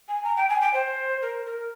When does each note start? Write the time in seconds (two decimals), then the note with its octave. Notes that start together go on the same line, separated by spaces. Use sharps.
0.08 G#5
0.24 A#5
0.36 G5
0.50 G#5
0.61 G5
0.74 C5
1.22 A#4
1.46 A#4